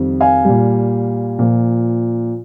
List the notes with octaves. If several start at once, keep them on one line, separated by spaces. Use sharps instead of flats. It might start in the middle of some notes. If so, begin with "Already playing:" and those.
Already playing: F2 D#3 G3
F5 G#5
A#2 G3
A#2 F3